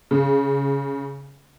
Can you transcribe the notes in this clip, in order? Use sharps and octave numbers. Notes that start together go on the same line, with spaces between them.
C#3